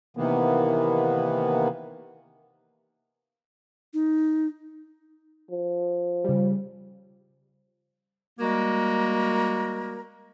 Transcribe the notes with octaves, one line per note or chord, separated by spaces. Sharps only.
C3 D#3 E3 A#3 B3
D#4
F3
C#3 G3
G3 G#3 A#3 F#4 A#4